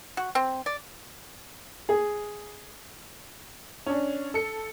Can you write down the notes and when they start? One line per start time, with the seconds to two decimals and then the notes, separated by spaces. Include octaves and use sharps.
0.17 F#4
0.35 C4
0.66 D5
1.89 G#4
3.86 C#4 D4
4.34 A4 C#7